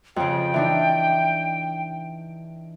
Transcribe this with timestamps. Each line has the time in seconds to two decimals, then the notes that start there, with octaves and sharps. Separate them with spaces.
0.16 F2 C#3 G5
0.54 E3 D4 D#4